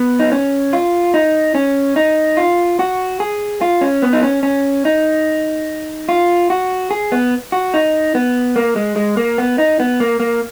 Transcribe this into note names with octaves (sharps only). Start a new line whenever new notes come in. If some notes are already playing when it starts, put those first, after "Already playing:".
Already playing: B3
D#4
C#4
F4
D#4
C#4
D#4
F4
F#4
G#4
F4
C#4
B3
D#4
C#4
C#4
D#4
F4
F#4
G#4
B3
F#4
D#4
B3
A#3
G#3
G#3
A#3
B3
D#4
B3
A#3
A#3